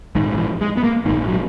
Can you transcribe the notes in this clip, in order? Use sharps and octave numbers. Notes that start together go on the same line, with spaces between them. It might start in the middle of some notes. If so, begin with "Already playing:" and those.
A#1 G#2 D#3
E3
G#3
B3
A#3
A#1 G#2 D#3
F#3